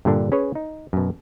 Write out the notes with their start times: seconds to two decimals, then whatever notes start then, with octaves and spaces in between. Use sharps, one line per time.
0.05 G2 A#2 D3 D4
0.32 C#4 G#4 B4 C#5
0.55 D#4
0.93 F#2 B2